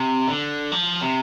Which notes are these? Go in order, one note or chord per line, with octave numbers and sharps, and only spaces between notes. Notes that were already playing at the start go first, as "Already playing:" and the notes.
Already playing: C3
D3
F3
C3